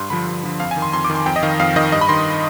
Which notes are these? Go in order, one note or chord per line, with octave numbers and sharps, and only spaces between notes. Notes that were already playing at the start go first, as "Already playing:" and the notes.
Already playing: G2 C6
D3 F3 B5
G2
D3 F3
F2 F5
G#5
D#3
C6
F2 C6
D6
D#3
C6
F2 G5
D#5
D#3 F5
F2 F5
D#3 D#5
G2 D#5
B5
D#3 C6